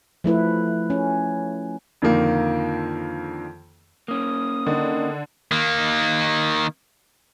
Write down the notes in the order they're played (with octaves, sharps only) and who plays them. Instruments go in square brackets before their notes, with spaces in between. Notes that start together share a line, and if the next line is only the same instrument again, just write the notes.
[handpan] F3 A3 E4 B4
C#4
[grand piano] F2 D3 D#3 F3 A#3
[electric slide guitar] A#3 C#4 [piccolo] D#6
[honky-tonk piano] D3 [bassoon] D#3
[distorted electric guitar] D#3 A#3